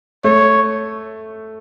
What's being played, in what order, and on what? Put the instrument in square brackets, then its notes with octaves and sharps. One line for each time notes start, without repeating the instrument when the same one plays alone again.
[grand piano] A3 [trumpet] C#5